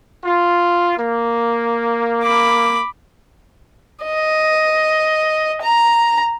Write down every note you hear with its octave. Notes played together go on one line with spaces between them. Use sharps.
F4
A#3
B5 D6
D#5
A#5